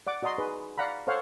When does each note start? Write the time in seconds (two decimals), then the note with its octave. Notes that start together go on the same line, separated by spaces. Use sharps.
0.07 D5 F#5 D6
0.23 F#4 D5 D#5 A#5 C6
0.38 D#4 G#4 B4
0.78 D5 F5 F#5 A#5 B5
1.07 A4 C5 C#5 F5 F#5